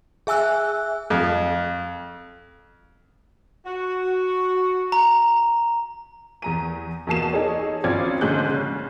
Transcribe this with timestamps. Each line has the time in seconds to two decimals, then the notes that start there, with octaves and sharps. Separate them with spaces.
0.27 G#4 E5 G#5 E6 F#6
1.10 F2
3.65 F#4
4.92 A#5
6.42 E2 A#5 D#7
7.07 E2 B2 A#3 A5 C7 E7
7.33 D#4 G#4 A4 C#5
7.84 G#1 C4 C#4 F4 D5 G#6
8.21 G#2 D3 C#4 G#4 F#6 G6
8.49 C#3